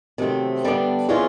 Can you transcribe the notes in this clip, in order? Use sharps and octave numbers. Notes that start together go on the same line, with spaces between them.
C3 D#3 F#3 A3 C4
D3 G3 B3 D4
E3 G#3 C#4 F4